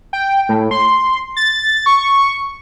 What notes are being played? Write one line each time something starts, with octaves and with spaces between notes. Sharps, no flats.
G5
A2
C6
A6
C#6